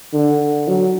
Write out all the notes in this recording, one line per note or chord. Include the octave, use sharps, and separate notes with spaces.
D3
F#3